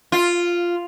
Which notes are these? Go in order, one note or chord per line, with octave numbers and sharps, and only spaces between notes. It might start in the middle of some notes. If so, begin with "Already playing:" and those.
F4